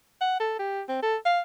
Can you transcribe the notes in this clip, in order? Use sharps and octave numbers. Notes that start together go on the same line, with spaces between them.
F#5
A4
G4
C4
A4
F5